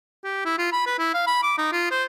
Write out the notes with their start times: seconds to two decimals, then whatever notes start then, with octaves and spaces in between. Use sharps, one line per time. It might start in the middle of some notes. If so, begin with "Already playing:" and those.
0.24 G4
0.45 E4
0.58 F4
0.72 B5
0.87 B4
0.99 E4
1.14 F5
1.27 B5
1.43 D6
1.58 D#4
1.72 F4
1.91 C5